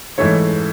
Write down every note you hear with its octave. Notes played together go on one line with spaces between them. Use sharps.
G#2 E3 A3 C#5